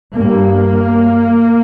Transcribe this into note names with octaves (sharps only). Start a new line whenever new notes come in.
G2 A#3